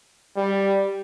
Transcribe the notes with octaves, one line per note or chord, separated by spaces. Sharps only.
G3